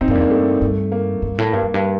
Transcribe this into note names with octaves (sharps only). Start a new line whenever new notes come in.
A2 C4 D#4
G2 A#3 D4
F2
G2 A#3
A3
G2
A#3
G2
A2
G2 A#3
F2
G2